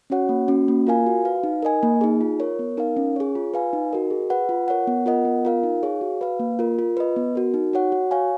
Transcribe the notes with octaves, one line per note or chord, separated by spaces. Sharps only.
C#4 F#4 C#5 F#5
A#3
C#4 F#4
A#3
F4 A#4 F5 G#5
F#4
B4 F5
D#4
A#4 D#5 G#5
A#3
D#4 G#4
F4
A#4 C#5
B3
D#4 A#4 F5
C#4
G#4 C#5
F4
B4 F5 G#5
D#4
F#4 A#4 D#5
G#4
B4 F#5
F4
A#4 C#5 F#5
B3
F4 A#4 D#5 F#5
B3
F4 A#4 F5
D#4
G#4 C#5 F5
F#4
B4 F5
A#3
F4 A#4
F4
B4 D#5
B3
F#4 A#4
D#4
F#4 C#5 F#5
F#4
C#5 F5 G#5